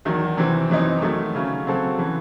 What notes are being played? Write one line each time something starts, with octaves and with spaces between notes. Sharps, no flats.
E2 D#3 F#3
C3 E3 C4
F#2 E3 C4 D#4
D#3 F#3 A3
C#3 F#3 C#4
C#3 F#3 C4 F#4 A4
C#3 E3